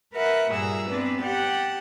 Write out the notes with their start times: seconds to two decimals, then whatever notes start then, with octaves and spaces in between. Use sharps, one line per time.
0.13 A#4 B4 E5 F#5
0.51 G2 A#2 G#4 A#5 E6
0.88 B3 C4 D4 B4
1.21 G4 F#5 G5 A5